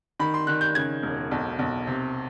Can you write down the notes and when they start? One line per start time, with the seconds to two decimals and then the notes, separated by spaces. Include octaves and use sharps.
0.19 D#3 B5
0.34 C6
0.47 D#3 F#6
0.61 G6
0.75 C#3 G#6
1.03 E1
1.31 B1
1.59 B1
1.87 C3